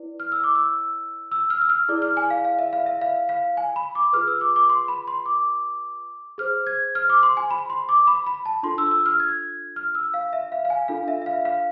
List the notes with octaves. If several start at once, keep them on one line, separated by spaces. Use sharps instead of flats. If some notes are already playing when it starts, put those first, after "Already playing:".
Already playing: E4 B4 D5
F6
E6
D6
E6
E6
F6
E6
F6
E4 G#4 D5
F6
G#5
F5
F5
E5
F5
E5
F5
F5
G#5
B5
D6
F4 G#4 B4 F6
E6
D6
D6
C6
B5
C6
D6
G#4 C5 F6
G#6
F6
D6
C6
G#5
B5
C6
D6
B5
B5
A5
D4 F4 A4 C6
E6
E6
F6
G#6
F6
E6
F5
E5
F5
F5
G#5
D4 F4 A4 F5
E5
E5
F5
F5